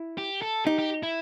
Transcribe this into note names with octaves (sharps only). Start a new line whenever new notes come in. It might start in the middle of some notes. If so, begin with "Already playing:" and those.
Already playing: E4
G4
A4
D#4 G4
G4
E4